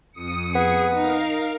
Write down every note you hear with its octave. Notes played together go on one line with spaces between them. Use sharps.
F2 D#6 C#7
B3 G#4
D#4 A#4 F5